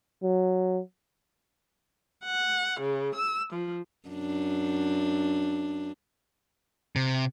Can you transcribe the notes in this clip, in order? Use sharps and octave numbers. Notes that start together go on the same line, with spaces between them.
F#3
F#5
C#3
E6
F3
F#2 D4
C3